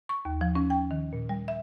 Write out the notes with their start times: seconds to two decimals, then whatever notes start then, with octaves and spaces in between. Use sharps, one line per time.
0.09 C#6
0.25 D#2
0.41 F3
0.55 C#4
0.70 G5
0.91 D#3
1.13 A#2
1.29 G3
1.48 E5